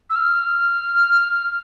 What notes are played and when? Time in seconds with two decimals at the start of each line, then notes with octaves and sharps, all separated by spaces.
0.10 E6
0.15 F6